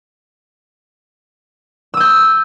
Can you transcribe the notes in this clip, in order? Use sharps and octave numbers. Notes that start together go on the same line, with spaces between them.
D#6 E6 G6